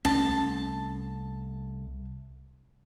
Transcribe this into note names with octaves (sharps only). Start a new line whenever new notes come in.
C2 A3 C#4 A5